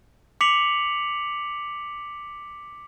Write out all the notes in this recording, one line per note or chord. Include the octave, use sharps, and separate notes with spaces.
D6 B6 C#7 F7 F#7